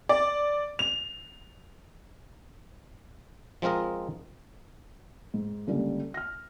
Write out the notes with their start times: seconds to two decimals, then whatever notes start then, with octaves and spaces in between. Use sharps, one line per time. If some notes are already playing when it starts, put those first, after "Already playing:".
0.09 D5
0.79 F7
3.62 F3 G#3 C4 F4 A#4 D#5
5.34 G#2
5.67 C#2 D3 G3 A#3
6.14 F6 A#6